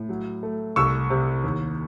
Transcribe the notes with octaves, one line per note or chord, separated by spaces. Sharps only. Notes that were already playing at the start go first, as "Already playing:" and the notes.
Already playing: A2
F#3
A3
C2 C#6 E6
C3
D#2